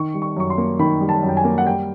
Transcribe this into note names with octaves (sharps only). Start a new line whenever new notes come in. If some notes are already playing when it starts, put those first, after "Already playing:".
Already playing: D#3 C#6
G3
C#6
F#2 C#6
C6
A#3
D#3 B5
G3
A5
F#2
G5
G#5
A#3
F#5
G3 G5